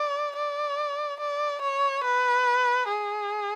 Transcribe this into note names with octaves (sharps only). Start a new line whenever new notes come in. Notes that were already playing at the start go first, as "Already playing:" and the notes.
Already playing: D5
D5
D5
C#5
B4
G#4